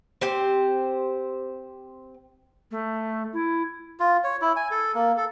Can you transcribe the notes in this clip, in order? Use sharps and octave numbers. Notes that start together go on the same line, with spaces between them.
C4 G4 C5
A3
E4
F4
C#5
E4
G#5
A4
A#3
A4